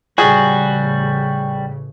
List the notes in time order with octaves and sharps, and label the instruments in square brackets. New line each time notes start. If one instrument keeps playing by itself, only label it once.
[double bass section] A1 C#3 [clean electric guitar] G3 F#4 [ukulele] G#4